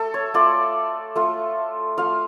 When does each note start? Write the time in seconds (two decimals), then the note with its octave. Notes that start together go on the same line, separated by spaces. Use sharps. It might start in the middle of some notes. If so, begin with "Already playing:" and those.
Already playing: A3 A4
0.14 C#5
0.34 A3 F4 D5
1.16 A3 F4
1.98 A3 F4 F5